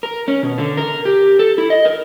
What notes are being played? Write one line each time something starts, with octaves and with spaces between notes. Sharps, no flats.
A#4
C#4
B2
D3
A#4
G4
A4
E4
D#5
A#4